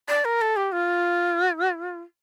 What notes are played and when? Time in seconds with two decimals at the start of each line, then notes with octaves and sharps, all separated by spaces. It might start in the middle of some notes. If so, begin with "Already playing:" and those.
0.09 D5
0.25 A#4
0.41 A4
0.56 G4
0.72 F4